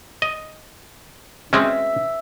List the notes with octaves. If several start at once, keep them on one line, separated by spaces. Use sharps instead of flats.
D#5
G#3 C4 C#4 E5